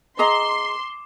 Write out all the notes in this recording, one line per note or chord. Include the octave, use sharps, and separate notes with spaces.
G#4 D#5 A#5 C6 D6